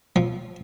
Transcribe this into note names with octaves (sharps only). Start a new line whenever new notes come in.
F3